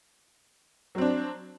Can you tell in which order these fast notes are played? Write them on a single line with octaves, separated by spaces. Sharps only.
F#3 C4 D4